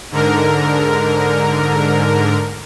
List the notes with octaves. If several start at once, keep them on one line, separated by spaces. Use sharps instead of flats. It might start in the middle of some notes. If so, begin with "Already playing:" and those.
G#2 D3 A#4